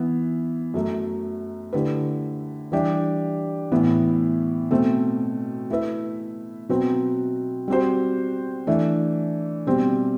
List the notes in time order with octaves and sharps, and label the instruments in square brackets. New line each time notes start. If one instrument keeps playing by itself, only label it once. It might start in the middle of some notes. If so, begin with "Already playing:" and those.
Already playing: [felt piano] E3 B3 E4
F#2 F#3 A3
D3 A3 E4 G4 B4
E3 G3 D4 G4
A2 E3 B3
B2 A3 C4
A3 E4 B4 E5
B2 F#3 C4 F#4 B4
G3 C4 F#4 C5
E3 A3 D4
B2 G3 C4